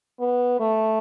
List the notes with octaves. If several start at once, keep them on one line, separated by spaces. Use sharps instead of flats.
B3
A3